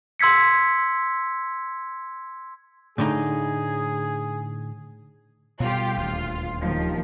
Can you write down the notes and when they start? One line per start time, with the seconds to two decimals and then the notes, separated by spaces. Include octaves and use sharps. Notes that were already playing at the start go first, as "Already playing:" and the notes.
0.19 C6 E6 G#6 B6 C#7
2.98 A2 D3 D#4 G#4
5.60 B2 G3 F4 G4
5.96 D#1 D2 F4
6.60 D#2 D#3 F3